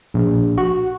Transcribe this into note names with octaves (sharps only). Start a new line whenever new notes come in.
A#1
F#4